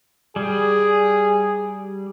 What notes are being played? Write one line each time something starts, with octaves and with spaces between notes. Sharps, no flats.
G3 G#4